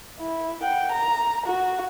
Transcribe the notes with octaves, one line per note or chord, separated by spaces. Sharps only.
E4
F#5 G5
A#5
F#4